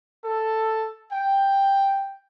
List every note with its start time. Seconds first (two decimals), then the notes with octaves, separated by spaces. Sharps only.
0.24 A4
1.12 G5